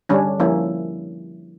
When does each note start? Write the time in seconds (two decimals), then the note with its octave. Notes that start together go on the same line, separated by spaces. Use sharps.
0.09 D3 G3 C#4 D4
0.40 F3 A#3 C#4 E4